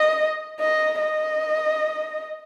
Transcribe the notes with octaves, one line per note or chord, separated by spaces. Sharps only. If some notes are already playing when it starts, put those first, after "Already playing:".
Already playing: D#5
D#5
D#5